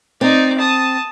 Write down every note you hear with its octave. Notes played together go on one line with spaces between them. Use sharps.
C4 D#4 D5
A5 D#6